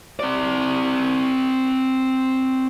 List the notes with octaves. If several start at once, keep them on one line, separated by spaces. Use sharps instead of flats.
C4 D5